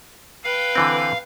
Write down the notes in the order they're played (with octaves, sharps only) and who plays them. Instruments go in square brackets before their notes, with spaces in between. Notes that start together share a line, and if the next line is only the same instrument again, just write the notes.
[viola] B4 G5 [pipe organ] F5
[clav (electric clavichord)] D3 E3 C4